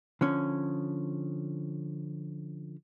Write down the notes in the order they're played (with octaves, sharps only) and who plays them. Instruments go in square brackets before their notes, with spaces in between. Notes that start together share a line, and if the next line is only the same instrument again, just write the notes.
[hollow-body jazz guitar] D3 F3 C#4